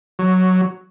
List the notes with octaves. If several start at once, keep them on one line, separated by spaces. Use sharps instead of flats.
F#3